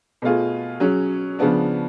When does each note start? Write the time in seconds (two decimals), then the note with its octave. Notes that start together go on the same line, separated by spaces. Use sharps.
0.22 B2 A3 F4 G#4
0.80 F#3 C#4 G#4
1.39 C#3 F3 B3 D4